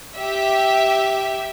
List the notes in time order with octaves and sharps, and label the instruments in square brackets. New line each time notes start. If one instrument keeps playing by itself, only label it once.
[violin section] G4 E5